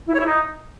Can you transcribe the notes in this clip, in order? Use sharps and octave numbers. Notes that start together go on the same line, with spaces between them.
E4
C#5
E4
D#4